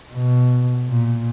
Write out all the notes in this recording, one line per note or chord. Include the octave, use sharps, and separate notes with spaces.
B2
A#2